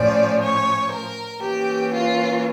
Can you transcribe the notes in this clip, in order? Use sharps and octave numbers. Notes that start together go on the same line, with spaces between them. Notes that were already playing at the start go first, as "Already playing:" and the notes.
Already playing: A2 F3 C#4 D5
C#5
A#4
E3 A#3 C#4 G4
F4